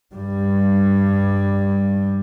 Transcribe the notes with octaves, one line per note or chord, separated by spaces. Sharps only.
G2 G3